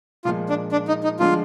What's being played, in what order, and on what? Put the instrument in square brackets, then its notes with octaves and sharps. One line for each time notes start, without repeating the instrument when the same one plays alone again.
[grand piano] A#2 F3 G#3 [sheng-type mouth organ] F4
[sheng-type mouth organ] D4
D4
D#4
D#4
[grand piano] D3 F3 G#3 D4 [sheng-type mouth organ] F4